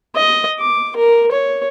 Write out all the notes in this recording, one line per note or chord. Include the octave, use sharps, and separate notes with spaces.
D#5
D6
A#4
C#5